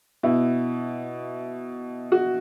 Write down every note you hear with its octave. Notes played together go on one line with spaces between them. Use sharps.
B2 E4
F#4